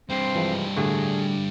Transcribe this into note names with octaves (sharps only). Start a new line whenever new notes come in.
G2 C4 C5
E3 F3 G#3
A2 D3 A3 F#4 G#4